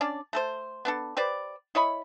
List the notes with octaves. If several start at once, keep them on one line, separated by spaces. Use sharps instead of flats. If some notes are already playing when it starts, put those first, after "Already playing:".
C#4 D4 D5
A3 A4 C5
B3 D4 A4
G4 B4 C5 D5
E4 C#5 D#5 B5